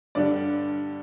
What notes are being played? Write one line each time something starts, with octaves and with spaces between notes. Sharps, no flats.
G2 D3 G3 D5